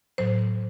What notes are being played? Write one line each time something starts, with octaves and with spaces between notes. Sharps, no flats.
A2 F#3 C5